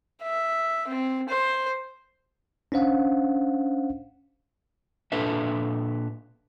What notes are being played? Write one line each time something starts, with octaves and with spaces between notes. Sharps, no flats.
E5
C4
C5
C#4 D4 C5 F5 F#5
A#2 D4 A4 B4 E5